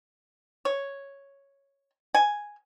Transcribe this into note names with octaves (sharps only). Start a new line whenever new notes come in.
C#5
G#5